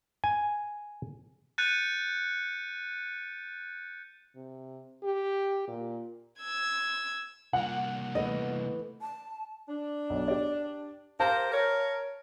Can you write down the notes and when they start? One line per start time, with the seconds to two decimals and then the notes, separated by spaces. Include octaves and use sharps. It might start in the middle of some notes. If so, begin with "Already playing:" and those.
0.24 G#5
1.58 F#6 G6 A6 C#7 D#7
4.36 C3
5.03 G4
5.68 A#2
6.41 E6 G#6
7.53 C2 A#3 F#5
8.15 E3 A3 B3 D#5
9.01 A5
9.68 D4
10.10 B1
10.28 G4 D5
11.19 G4 A#4 C5 F5 A5
11.52 A#4 C#5